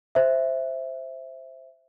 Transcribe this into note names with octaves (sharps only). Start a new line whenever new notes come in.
C5 E5